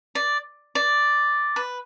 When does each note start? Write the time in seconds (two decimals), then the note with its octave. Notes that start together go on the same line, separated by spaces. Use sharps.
0.15 D5
0.75 D5
1.56 B4